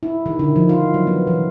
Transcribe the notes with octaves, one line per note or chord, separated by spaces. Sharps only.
E4
D#3
D3
F3
F4
F#3
B3
E3